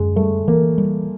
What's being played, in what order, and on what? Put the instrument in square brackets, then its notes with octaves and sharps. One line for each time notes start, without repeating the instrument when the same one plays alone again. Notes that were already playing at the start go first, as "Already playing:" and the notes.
Already playing: [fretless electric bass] F#2 [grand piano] G#3
[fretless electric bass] G3 [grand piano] A3
[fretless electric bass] E3 [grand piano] A#3
[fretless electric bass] G3